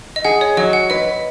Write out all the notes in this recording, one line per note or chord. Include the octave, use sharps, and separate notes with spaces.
D#5
G#4 F#5
C#5
F#3 D#5
F#5
B4 D#5